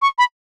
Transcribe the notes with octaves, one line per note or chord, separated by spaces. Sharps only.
C#6
B5